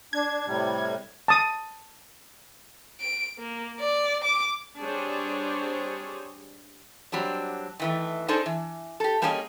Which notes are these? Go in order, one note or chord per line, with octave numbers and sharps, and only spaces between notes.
D4 G#6
A2 C3 G3
A5 D#6
D7
A#3
D5
D6
G3 C4 D4 G#4 C5 C#5
F#3 G3 C4 D4
D#3 E3 A3
D4 D#4 G#4 A4 C5
E3
G4 A4
G3 A#3 C#4 G#4 C5 D#5